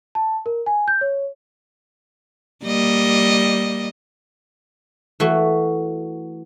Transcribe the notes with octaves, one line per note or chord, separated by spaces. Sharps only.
A5
A#4
G#5
G6
C#5
G3 A#3 D#5
E3 A3 F#4